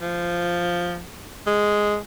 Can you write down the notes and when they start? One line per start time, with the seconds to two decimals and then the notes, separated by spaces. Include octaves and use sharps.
0.01 F3
1.46 G#3